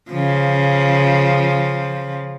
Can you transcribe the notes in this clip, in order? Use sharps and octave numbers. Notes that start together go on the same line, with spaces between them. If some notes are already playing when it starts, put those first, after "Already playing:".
C#3 F3